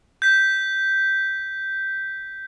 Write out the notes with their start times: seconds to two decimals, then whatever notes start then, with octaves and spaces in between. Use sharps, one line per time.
0.22 G6 B6